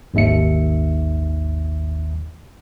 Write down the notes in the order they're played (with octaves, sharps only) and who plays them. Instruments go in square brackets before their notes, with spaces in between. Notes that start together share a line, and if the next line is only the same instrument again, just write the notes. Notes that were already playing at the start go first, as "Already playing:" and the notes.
[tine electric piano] G#1 D#2 E5 C#7